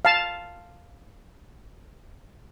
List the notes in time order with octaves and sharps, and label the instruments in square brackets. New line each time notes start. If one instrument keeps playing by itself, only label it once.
[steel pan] F5 A5